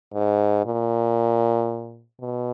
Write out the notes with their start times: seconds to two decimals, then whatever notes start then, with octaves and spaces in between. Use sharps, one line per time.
0.14 G#2
0.65 A#2
2.21 B2